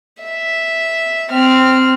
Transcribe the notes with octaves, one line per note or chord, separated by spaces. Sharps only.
E5
C4 F6